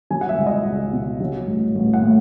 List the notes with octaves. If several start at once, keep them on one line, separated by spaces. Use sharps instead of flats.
F#3 G#5
F#5
E5
C#2
D#5
C#2
B2
F#3
A1
A1
F#5
A2